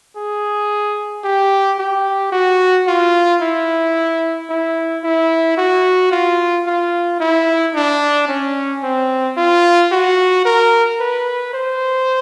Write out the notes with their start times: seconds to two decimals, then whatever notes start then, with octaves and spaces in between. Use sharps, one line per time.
0.16 G#4
1.24 G4
1.79 G4
2.32 F#4
2.87 F4
3.41 E4
4.50 E4
5.04 E4
5.58 F#4
6.12 F4
6.67 F4
7.20 E4
7.75 D4
8.28 C#4
8.83 C4
9.37 F4
9.92 F#4
10.45 A#4
11.00 B4
11.54 C5